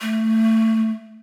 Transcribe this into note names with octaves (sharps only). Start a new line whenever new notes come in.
A3